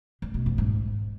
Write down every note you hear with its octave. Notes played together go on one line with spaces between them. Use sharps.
D3
B2
F2
G#2